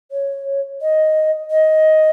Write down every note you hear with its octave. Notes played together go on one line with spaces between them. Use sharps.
C#5
D#5
D#5